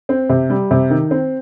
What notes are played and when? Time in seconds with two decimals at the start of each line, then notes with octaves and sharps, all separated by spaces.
0.09 C4
0.29 C3
0.50 G3
0.71 C3
0.90 D#3
1.11 C4